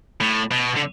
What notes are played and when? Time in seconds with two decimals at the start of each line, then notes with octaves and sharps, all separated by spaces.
0.21 A2
0.51 B2
0.76 D3